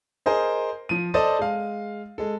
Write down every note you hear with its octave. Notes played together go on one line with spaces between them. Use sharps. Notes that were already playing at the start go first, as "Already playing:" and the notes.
G#4 A#4 C5 D#5
F3 D#7
A4 C5 D5 D#5 A5 D#6
G#3 F5
G#3 A4